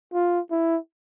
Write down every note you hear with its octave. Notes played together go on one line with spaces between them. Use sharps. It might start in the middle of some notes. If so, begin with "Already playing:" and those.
F4
E4